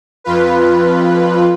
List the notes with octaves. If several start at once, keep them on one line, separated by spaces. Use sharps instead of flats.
F2 F4 B4